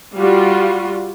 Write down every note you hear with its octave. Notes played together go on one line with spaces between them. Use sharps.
G3 F4 F#4